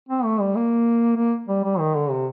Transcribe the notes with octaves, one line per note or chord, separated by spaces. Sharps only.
C4
A3
G3
A#3
A#3
G3
G3
D#3
D3
C3